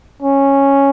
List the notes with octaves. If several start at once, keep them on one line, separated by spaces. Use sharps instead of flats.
C#4